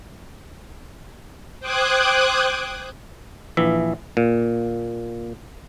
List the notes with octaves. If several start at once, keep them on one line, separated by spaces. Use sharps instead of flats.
C5 G5 D6 D#6 F#6 G#6
A#1 E3 E5
A#2